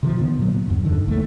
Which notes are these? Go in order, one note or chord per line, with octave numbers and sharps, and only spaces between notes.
C3 D#3 F3
D3 D#3 B3
A#2 F#3
E2 G2
G2 D3 D#3
A#1 E2 A3